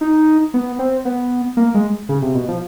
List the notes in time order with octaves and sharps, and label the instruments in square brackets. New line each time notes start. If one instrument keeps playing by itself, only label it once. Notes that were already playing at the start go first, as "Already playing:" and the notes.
[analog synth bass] D#4
B3
C4
B3
A#3
G#3
C#3
C3
B2
F3